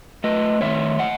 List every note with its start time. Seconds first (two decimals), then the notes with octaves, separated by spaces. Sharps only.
0.24 A3 B4 D#5
0.61 D#3 C#5 E5
0.99 D#5 F#5